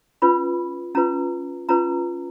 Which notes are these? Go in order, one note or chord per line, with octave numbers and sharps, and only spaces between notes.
C#4 F4 B4 B5
C#4 F4 B4 A#5
C#4 F4 B4 A#5